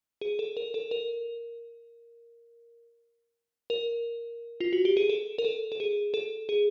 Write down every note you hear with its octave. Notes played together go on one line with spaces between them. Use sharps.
G#4
A4
A#4
A4
A#4
A#4
F4
F#4
G4
G#4
A4
A#4
A4
A4
G#4
A4
G#4